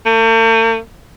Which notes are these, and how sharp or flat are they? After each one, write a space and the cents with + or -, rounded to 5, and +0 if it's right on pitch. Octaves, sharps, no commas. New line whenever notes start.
A3 +45